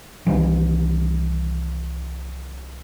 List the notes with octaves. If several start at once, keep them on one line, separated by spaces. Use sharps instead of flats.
C2 D#3 E3